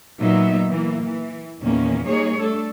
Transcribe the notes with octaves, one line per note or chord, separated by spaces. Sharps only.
A#2 F#3 B3 D#4 E5
E3 A#3
E3
E2 A#2 D#3 A#3 C#4
G3 A#3 D#4 G#4 C#5
A3 D4 A4